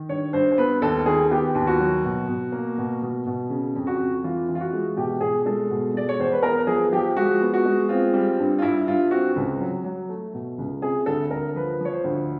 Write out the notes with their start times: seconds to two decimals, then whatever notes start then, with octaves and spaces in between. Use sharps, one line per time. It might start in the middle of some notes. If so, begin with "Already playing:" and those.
Already playing: D#3
0.09 G2 C#5
0.33 G2 C5
0.52 C5
0.58 B3 B4
0.82 D#2 A4
1.06 D#3 G#4
1.30 B3 G4
1.55 D#2
1.67 F#4
1.80 F#3
2.04 B2
2.28 B2
2.52 A#3
2.78 B2
3.02 B2
3.26 B2
3.50 C#3
3.75 F2
3.87 F#4
3.99 F2
4.24 E3 F4
4.49 E3
4.55 F4
4.60 F#4
4.73 G#3
4.97 B2 G4
5.21 B2 G#4
5.45 G#3 A4
5.70 B2
5.94 G#3 D5
6.09 C#5
6.19 E2 C5
6.32 B4
6.43 B3 A#4
6.67 F3 G#4
6.93 F3 G4
7.16 G#3 F#4
7.41 B3
7.54 F#4
7.65 G#3
7.89 C4 F4
8.13 G3
8.39 G2
8.58 F4
8.62 G2 E4
8.87 G2 F4
9.11 C4 F#4
9.36 C#2
9.61 F#3
9.84 F#3
10.09 A3
10.34 B2
10.58 C#2
10.82 C3 G#4
11.06 D2 A4
11.31 D2 A#4
11.55 F3 B4
11.81 F3 C#5
11.92 C5
12.04 D2